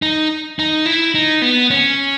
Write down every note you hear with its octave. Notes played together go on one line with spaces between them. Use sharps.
D#4
D#4
E4
D#4
B3
C#4